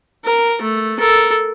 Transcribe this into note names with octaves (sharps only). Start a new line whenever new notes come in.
A#4
A3
A4 A#4